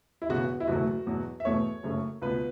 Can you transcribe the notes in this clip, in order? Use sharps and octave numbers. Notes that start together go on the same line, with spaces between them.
E4
E1 E2 C#3 E3 B3 F#4
E4
F#1 E2 B2 F#3 A3 F#4
E2 B2 F#3
E5
E2 B2 A3 C#5
F#1 F#2 C#3 A3
C#2 B2 B3 B4